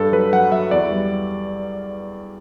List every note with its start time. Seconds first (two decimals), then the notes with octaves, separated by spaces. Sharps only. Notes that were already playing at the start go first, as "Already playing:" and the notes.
Already playing: G2 A4
0.12 F#3 B4
0.33 F#3 F#5
0.52 F#3 E5
0.71 E2 D5
0.91 G3